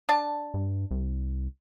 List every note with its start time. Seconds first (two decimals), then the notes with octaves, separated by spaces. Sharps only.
0.09 D4 A5
0.54 G2
0.91 C2